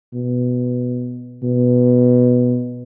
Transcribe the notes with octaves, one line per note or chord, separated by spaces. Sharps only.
B2
B2